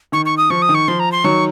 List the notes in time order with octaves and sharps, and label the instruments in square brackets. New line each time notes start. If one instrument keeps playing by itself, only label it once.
[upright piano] D#3 [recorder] C#6
[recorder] C#6
D#6
[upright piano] F3 [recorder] C#6
[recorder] D#6
[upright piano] D#3
[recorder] C#6
[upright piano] F3 [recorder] C6
[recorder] A#5
C6
[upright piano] D#3 F#3 [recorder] C#6